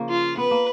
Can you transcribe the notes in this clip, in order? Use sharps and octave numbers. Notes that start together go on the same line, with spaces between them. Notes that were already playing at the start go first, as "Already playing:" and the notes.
Already playing: C#3 F3 A#3
F4
B3 B4
A#3